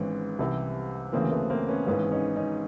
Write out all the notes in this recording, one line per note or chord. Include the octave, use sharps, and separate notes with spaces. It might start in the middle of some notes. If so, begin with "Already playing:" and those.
Already playing: G#1 G#2 E3 B3 C#4
C2 C3 E3
D2 C#3 E3 A#3 C4
A3 B3
A#3 C4
B3 C#4
G#1 G#2 E3 B3 C#4
C#4 D#4
C#4 D#4